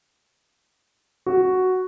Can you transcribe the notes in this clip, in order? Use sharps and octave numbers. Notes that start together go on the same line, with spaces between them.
F#4